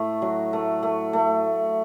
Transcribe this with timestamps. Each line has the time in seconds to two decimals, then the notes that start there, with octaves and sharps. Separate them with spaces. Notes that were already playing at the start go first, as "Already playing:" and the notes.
Already playing: A2 A3
0.22 F#3
0.53 A3
0.83 A3
1.13 A3